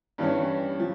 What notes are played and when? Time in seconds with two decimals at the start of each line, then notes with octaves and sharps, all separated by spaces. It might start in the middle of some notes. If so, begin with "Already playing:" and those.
0.18 G2 E3 G3 C#4
0.79 F3